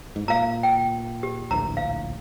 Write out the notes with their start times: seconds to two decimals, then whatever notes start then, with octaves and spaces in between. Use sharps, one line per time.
0.16 G#2
0.28 A#2 F5 A#5
0.63 G5
1.23 G4
1.51 D1 A#1 A2 A#5
1.77 F5